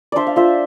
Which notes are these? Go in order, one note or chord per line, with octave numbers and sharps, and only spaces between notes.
D4 C5 D5 E5
F5
F4 C5 E5